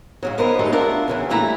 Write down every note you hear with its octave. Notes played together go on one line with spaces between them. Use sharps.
G#2 C#3 F#3
F#2 B3 D#4 A#4 C5 A#5
D#2 F#3 G#3 A3 D#4 A4
D4 F4 A#4 E5 F#5
E2 C#3 E3
A#2 G3 A3 E4 F#5 A#5